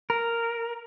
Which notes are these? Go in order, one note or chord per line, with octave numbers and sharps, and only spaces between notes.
A#4